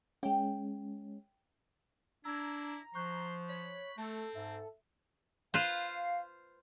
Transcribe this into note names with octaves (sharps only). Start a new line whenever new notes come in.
G#3 C#4 G5
D4 E4 A#5 E6 G#6
F3 C6 C#6 F#6 G6
C#5 B5
A3 C4 A4
G#2 E5
F4 B4 C5 F5